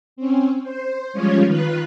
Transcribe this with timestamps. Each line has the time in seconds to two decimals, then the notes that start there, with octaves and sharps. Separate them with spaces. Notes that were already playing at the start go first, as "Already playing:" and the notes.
0.16 C4 C#4
0.63 C5
1.13 F3 G3 G#3 C#4 F4 C#5
1.46 D#3 F4 B4 F#6